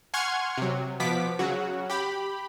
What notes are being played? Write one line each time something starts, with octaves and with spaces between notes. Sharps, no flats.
F#5 G#5 C6 C#6 F6 G#6
C3 F#3
B2 F3 B3 D6 B6
C#3 F#3 F#4
G4 B5